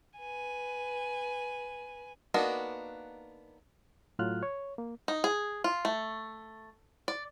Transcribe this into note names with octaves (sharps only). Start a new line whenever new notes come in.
B4 G#5
A#3 B3 D4 D#4 F#4
A2 F#3 F4 F6 F#6
C#5
A#3
D#4
G#4
F4
A3
D5